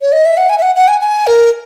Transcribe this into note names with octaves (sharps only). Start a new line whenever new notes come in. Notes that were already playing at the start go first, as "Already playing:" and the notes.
C#5
D#5
E5
F#5
G#5
E5
F#5
F#5
G#5
G#5
A#4